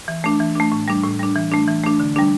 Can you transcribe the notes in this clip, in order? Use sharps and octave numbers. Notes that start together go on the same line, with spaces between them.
E3
A3 D4
E3
A3 D4
A2
G3 D4
A2
G3 D4
E3
A3 D4
E3
A3 D4
D3
G3 D4